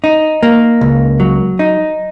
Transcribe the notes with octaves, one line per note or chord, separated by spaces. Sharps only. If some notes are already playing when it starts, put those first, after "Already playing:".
D#4
A#3
C#2
F#3
D#4